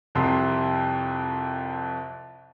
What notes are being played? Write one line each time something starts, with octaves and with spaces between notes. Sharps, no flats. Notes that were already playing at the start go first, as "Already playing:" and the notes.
C2 F2 C3 C6